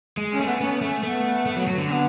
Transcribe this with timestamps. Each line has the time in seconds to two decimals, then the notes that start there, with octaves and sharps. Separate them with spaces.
0.17 G#3
0.32 C#4
0.40 A3
0.46 B3
0.60 B3 C#4
0.82 A3
1.03 A3 B3
1.46 A3
1.56 F#3
1.67 F#3
1.78 D3
1.88 C#4
1.92 B3